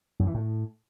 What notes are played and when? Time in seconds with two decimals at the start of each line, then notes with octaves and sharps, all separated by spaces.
0.19 F#2
0.27 E3
0.34 A2